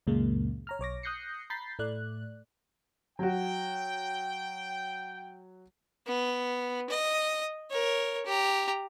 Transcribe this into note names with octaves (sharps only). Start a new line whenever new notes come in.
C#2 F#2 A#2 C#3 G#3 A#3
C#5 A#5 F6
B1 C#5 D6 A#6
D#6 F#6 G6 A#6 C7 C#7
A#5 B5 G6 A6 B6 C7
A2 A3 D5 F#6
F#3 F#4 G5
B3
D#5
A#4 C#5
G4 A#5